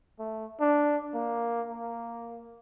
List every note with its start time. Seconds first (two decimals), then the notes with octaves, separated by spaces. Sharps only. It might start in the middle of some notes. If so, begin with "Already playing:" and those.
0.19 A3
0.60 D4
1.14 A#3
1.68 A#3